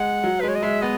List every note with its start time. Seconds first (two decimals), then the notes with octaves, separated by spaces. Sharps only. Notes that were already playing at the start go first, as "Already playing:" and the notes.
Already playing: G#3 F#5
0.24 F#3
0.41 G#3 B4
0.48 C#5
0.56 D#5
0.63 G#3 E5
0.82 B3 D#5